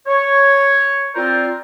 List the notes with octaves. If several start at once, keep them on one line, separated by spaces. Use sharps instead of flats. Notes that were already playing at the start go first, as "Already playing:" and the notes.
C#5
C4 F4 A#4 C5 D5